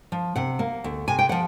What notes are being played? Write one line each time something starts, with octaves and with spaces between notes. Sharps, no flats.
F3
C3 F#5
A#3
D2
C3 G#5
G5
F3 F#5